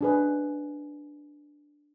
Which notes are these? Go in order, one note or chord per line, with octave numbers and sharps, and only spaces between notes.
D4 G#4 B4